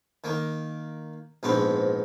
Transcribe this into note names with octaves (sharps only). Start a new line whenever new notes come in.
D#3 A#3
A#1 G#2 B3 C4